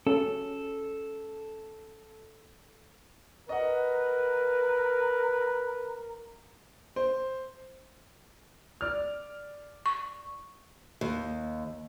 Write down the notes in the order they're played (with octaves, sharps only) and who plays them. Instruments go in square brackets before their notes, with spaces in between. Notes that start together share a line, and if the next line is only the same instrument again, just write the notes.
[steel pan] C#4 [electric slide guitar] A4
[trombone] A#4 [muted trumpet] B4 [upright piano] D#5 F#5
[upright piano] C5
D5 F6
[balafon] C#6
[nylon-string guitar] D#2